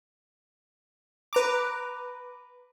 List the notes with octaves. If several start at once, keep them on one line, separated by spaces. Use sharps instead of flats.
B4 A#5 D6